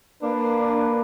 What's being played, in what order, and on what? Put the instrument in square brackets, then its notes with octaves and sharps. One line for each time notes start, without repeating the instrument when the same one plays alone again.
[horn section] A#3 D4 B4